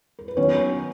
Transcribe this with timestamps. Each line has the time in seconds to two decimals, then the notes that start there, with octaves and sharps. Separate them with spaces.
0.19 A#4
0.28 B4
0.37 D#3 F#3 B3 C#4 D#4 C#5